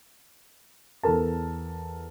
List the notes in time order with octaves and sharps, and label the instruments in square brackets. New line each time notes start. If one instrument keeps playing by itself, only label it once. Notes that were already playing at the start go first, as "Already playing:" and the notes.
[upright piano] E2 A4 A#4 A5